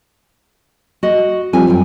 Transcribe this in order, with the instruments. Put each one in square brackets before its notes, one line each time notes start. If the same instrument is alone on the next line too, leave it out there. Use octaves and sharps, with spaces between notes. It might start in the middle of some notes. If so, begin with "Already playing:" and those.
[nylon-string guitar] F#4 D#5
[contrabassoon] F2 [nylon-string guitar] G3 G#5
[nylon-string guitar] F#2 G5